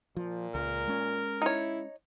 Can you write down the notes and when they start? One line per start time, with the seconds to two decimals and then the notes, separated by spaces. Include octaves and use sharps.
0.17 A#2 F3
0.55 C#2 A#4
0.87 G#3 C#4
1.42 D#4 E4 C#5